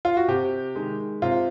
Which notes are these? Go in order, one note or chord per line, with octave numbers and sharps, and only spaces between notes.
F4
F#4
C3 G4
D#3 G#3
C3 F4